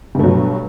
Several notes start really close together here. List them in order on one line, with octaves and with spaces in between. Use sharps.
G2 A3 F#3 B2